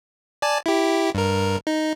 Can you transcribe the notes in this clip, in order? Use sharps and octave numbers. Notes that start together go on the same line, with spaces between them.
D5 G#5 A5
E4 G4
G2 A#4
D#4